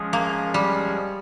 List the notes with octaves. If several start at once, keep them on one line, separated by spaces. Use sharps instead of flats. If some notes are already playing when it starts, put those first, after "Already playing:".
Already playing: F3 G#3 C#4 G#4
A#3
G3